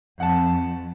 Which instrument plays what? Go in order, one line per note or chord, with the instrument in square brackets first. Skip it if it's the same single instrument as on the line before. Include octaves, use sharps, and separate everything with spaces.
[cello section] F2 [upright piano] F#5 A5